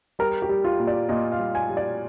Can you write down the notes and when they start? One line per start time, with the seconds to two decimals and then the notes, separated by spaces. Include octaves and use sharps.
0.19 G3 A#4
0.42 G4
0.49 G3
0.64 F4
0.80 A#2
0.87 D5
1.09 A#2 D#5
1.32 F5
1.39 G3
1.55 G#5
1.69 G3
1.77 D5